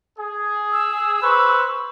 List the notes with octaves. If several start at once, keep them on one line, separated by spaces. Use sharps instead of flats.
G#4
E6
B4 C5 C#6